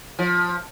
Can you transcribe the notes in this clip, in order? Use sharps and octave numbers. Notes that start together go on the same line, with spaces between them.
F3